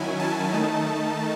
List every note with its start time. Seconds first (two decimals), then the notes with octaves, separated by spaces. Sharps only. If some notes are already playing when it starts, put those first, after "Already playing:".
Already playing: D#3 F#3 C#4 E4 G#5
0.19 A5
0.52 D#3 A3 D#4